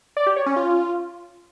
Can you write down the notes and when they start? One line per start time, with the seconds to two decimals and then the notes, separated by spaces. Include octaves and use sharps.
0.17 D5
0.27 G4
0.36 C#5
0.46 C#4
0.56 F4